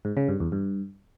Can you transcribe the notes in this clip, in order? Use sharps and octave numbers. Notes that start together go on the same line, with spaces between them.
G#2
C#3
G2
E2
G2